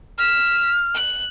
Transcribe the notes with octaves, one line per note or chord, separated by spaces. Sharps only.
F6 B6 E7
F#6